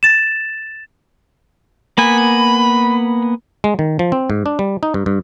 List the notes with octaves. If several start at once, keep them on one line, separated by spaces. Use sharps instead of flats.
A6 E7
A#3 B3 G#5 B5
G#3
D#3
F3
C4
G#2
D4
G3
D#4
G2
G2